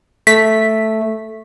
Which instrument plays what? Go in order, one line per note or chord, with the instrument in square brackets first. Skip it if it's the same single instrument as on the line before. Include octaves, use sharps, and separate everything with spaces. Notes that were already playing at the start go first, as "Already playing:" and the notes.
[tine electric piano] A3 [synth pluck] B6